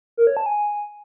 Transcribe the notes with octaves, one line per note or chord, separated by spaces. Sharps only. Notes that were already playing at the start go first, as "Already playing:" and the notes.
A#4
C#5
A5
G#5